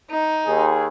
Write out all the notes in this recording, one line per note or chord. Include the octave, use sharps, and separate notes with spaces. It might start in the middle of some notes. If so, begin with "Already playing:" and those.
D#4
D#2 G#4